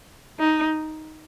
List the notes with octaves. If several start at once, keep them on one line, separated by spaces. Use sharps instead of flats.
D#4